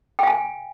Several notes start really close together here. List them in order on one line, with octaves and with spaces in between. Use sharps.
G5 F5 G#5